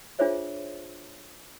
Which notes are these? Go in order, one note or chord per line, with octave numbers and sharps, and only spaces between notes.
D4 F4 G#4 C5 C#5 E5